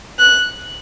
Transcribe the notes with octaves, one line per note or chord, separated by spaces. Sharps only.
F#6